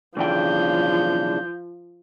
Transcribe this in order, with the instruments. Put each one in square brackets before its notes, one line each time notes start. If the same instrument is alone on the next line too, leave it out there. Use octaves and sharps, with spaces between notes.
[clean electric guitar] B1 E3 G5 [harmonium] C#3 D4 [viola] F3 [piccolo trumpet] G6